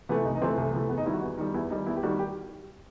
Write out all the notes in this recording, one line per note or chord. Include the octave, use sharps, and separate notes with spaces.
C3 E3 A3 B3
C2 D#4
D#4
C3 E3 A3 C4
C2 A3
C3 E3 A3 B3
E2 B3
D#4
D#3 G3 E4
F#4
E2
D#3 G3
E2 E4
D#3 G3 D#4
E2 E4
G4
D#3 G3 F#4
G4